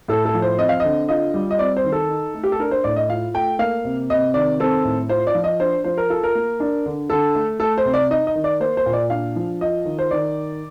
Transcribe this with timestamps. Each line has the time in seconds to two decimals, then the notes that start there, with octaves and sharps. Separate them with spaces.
0.08 A2 A4
0.25 A4
0.35 F3
0.42 C5
0.58 C4 D#5
0.69 F5
0.80 D3 D#5
1.09 F4 D#5
1.34 G3
1.51 D#5
1.59 C4 D5
1.76 C5
1.84 D#3
1.92 A4
2.09 D#4
2.34 A3
2.43 G4
2.52 A4
2.59 D4 A#4
2.71 C5
2.84 A2 D5
2.96 D#5
3.09 F4 F5
3.34 A3 G5
3.59 A#3 F5
3.84 C3
4.10 C3 D#5
4.34 D#3 D5
4.60 C4 A4
4.85 A2
5.09 F4 C5
5.27 D5
5.35 F3
5.44 D#5
5.60 D4 C5
5.84 F3 C5
5.97 A#4
6.10 F4 A4
6.23 A#4
6.35 A#3
6.60 D4
6.86 D3
7.10 D3 A4
7.35 A3
7.60 A3 A4
7.78 C5
7.85 C3
7.94 D5
8.10 D#4 D#5
8.27 D#5
8.35 D#3
8.44 D5
8.60 A#3 C5
8.77 C5
8.86 A#2
8.93 D5
9.10 D4 F5
9.36 F3
9.61 F4 D#5
9.85 D#3
9.99 C5
10.11 D#3 D5